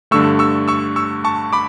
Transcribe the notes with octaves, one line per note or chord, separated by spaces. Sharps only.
G2 D3 A3 C#6 E6
C#6 E6
C#6 E6
C#6 E6
A5 C#6
B5 D6